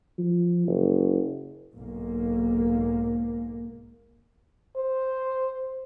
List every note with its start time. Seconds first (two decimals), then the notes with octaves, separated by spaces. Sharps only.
0.18 F3
0.67 F#1
1.73 B1 G#2 A#3
4.77 C5